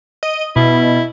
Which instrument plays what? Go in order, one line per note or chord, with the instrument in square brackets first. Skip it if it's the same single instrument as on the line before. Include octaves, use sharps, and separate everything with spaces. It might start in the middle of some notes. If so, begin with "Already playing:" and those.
[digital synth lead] D#5
[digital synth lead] B2 [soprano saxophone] E4